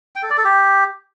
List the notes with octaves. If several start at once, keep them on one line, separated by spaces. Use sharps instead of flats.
G5
A4
D5
A4
G4